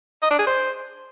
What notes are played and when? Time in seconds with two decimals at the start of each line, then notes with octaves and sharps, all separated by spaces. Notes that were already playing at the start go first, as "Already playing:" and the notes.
0.22 D#5
0.31 D4
0.39 G#4
0.47 C5